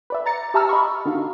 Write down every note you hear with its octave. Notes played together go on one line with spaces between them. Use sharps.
B4 D5 E5
A#5 A6 C#7
G4 E5 A5 A#5 E6 F6
D#5 B5 C#6
D3 D#3 F#4 F5